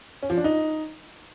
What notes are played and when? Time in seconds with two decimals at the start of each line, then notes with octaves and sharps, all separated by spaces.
0.22 C#4
0.30 F3
0.37 D4
0.44 D#4